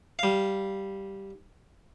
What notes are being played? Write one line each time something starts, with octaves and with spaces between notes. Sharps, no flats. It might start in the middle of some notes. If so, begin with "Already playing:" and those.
G3 F5